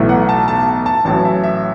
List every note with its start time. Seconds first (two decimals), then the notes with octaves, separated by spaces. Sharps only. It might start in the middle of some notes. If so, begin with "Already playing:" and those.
Already playing: B1 A2 E3 A3
0.09 F#5
0.29 A5
0.48 A5
0.86 A5
1.05 A1 A2 F#3 A5
1.25 E5
1.44 E5